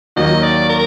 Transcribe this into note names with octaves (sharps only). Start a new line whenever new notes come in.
D#2 D#3 F#3 A#3 D#5
D5
A#4